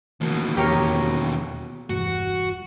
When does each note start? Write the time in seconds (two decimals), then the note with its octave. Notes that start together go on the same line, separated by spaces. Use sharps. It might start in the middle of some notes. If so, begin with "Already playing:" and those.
0.21 D#2 B2 D3 D#3 A3
0.57 E2 G4 A#4 C#5
1.90 E1 E2 G2 F#4